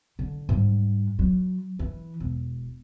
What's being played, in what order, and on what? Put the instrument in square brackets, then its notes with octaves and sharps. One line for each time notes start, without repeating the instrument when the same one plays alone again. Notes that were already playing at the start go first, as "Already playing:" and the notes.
[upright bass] D3
G#2 G3
F#3
E3
E1